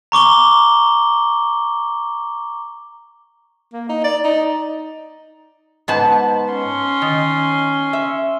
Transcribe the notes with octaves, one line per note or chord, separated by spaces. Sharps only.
A#5 C#6 D6 G7
A#3
D#4
D5
D#4
G#2 B3 A5
C#4 C6
D#3
E5